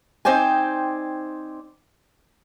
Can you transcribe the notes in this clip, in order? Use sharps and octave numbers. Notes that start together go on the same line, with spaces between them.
C4 D#4 C5 D5 G5 G#5